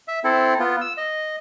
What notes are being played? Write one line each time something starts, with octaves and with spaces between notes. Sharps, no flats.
E5
C4 E4 A4
B3 F4
E6
D#5